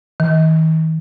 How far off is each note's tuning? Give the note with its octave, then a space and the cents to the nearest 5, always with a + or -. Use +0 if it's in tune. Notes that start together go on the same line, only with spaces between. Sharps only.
D#3 +45